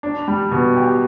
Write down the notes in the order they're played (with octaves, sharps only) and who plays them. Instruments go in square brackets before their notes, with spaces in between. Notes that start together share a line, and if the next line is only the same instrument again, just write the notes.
[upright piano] D4
G3
B2
G4